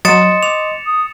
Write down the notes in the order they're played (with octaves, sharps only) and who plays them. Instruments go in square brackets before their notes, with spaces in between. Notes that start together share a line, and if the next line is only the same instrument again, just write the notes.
[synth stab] F#3 [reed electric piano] D#5 C6 D#6 [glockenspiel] A6 C#7 E7
[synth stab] D6 [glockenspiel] F7
[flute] D#6